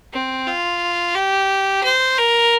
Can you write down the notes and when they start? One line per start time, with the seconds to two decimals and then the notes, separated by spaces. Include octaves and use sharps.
0.13 C4
0.47 F4
1.15 G4
1.83 C5
2.18 A#4